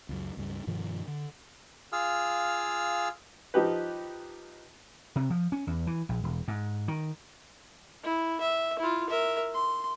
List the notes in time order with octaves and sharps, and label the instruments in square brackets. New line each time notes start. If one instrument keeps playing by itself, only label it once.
[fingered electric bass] C#2 F#2
C#2 G2
G2 B2 D#3 F3
D3
[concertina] F4 G#4 F5 E6 F6
[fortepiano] F3 D#4 G4 B4
[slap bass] C3
F3
C#4
E2
E3
A#1
E1
G#2
D#3
[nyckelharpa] E4
E5
E4 F4
A#4 E5
C6